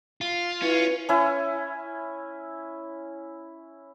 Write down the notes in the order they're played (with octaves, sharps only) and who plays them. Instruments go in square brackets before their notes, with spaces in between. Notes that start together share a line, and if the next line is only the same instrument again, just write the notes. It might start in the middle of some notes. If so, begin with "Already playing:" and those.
[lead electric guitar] F4
[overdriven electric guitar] C#4 [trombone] E4 [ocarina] B4
[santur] C#4 E4 G#5